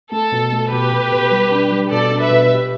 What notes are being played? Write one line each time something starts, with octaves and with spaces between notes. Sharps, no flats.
A3 A4
B2
A3
B2 G4 B4
B2
B2
G3
D4
G3
B2 A4 D5
D4
B4 E5
B2
G4